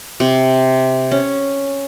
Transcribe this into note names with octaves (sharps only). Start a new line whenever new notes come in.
C3
C#4